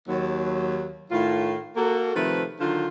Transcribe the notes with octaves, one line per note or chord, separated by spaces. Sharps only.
D#2 F#3
A2 D#3 F4
A#3 F#4 A4
C3 D#3 F3 A3 A4 B4
D3 D#3 F#3 F4 C5